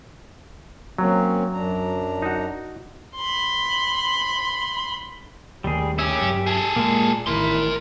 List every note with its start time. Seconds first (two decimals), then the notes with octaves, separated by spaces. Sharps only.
0.98 F#3 A#3 C4 C#4
1.53 F#2 D4 A#5
2.22 D#4 F#4
3.16 B5 C6
5.64 D#2 D#3 G3 A3 G#4
5.99 C#4 G4 G#4 E5
6.21 G2 F#3
6.47 G#4 A4
6.76 A#2 G#3 A#3
7.27 A1 A2 D#3 E4 A#4 C6